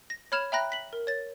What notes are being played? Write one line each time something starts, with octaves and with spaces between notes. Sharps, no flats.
A#6
C#5 B5 F6 G#6 E7 F7
E5 G5 A#5 B5 F#6 A#6
B6 F#7
A#4
C#5 A6